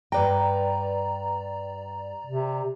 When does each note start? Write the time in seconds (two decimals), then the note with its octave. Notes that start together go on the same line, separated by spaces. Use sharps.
0.12 G2 B4 D5 G5 A#5
2.26 C3